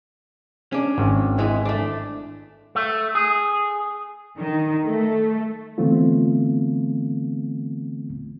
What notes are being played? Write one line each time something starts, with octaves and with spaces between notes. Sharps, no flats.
C#4 D4
G#1
E3 G#3 E4
A3 D4
A3
G#4
D#3
A3
D3 E3 A3 B3 C4 F4